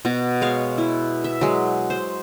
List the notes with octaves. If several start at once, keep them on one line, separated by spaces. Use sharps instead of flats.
B2 F#4
G#3 C#5 F5
E4
E5
F#3 G#3
C5